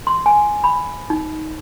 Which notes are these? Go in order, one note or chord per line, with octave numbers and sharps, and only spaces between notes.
C6
G#5
B5
D#4